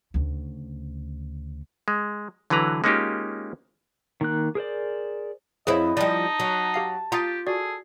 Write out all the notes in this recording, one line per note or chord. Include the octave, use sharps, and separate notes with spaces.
D2 C#3
G#3
D3 E3 F#3 B4 A#5
G#3 A#3 C#4 D#4 F4 G4
D#3 A#3 F#6
G#4 A#4 C5 D5
F2 C4 E4 G#4 C5 C#5 D#5
F3 G3 D#4 D5 D#5 A5
F#3
G4 F5 C7
F4 G4 A#5 D#6 A6
F#4 G#4 A4 D5